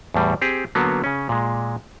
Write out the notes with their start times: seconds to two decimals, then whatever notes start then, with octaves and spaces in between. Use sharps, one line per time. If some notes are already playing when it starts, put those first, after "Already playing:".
0.14 E2 A2 G3
0.41 C4 G4 G#4
0.75 D3 F#3 A#3 B3
1.04 C#3 C#4
1.29 A#2 G#3